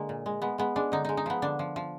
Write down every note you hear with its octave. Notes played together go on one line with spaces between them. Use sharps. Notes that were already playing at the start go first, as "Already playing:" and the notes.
Already playing: D3 G#3 A#3
A#2
G#3
G#3 B3
G#3 B3
G#3 D4
D3 D#4
G#3 D#4
D#4
F3 B3
D3 D4
F3
F3